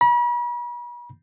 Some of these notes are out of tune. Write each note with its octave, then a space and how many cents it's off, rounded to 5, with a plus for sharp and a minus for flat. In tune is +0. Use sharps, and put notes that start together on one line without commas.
B5 -45